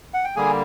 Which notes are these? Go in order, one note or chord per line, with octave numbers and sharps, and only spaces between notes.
F#5
G5
D3 G3 A#3 G#4 G#5